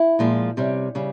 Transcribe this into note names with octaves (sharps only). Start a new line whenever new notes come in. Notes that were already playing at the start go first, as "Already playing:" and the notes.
Already playing: E4
A#2 F3 G#3
C3 G3 C#4
C#3 G3